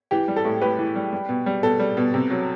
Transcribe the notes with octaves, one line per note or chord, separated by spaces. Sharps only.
E3 G4
G3
A4
A2
A2 G4 B4
E3
G3
G3
B2
G3
B2 A4
G3
B2
C3
F#3